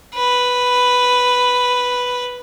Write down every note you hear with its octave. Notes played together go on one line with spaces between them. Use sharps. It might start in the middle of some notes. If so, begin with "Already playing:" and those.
B4